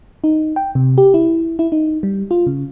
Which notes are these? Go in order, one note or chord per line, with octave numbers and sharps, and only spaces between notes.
D#4
G5
C3
G4
E4
E4
D#4
G3
F4
C#3